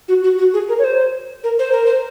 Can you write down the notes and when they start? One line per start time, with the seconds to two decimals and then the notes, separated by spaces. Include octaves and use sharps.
0.08 F#4
0.23 F#4
0.38 F#4
0.54 G#4
0.69 A#4
0.79 C#5
0.84 C5
1.44 A#4
1.59 C5
1.72 A#4
1.86 C5